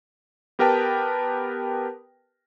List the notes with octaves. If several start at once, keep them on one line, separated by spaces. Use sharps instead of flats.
B3 G4 A#4 B4 G5 A5